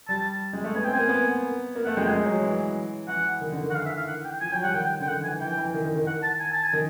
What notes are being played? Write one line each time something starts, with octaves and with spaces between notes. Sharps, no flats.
G3 A5
G#3
A3
B3 G#5
C4 G5
A#3 G#5
B3
A#3
A3 F#5
G#3 G5
G#3 G#5
F#3
E3
E3 F#5
D#3
D3
D#3
F#5
E3 F5
E5
F5
F#5
G5
F3 G#5
F#3 G5
G3 F#5
D#3 G5
D3 G5
D#3 F#5
E3 G#5
E3 G5
E3
D#3
D#3
D#3
F#5
A5
G#5
A5
G#5
D#3